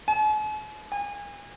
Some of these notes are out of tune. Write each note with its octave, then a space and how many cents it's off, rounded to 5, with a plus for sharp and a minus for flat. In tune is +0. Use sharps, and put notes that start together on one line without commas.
G#5 +45
G#5 -35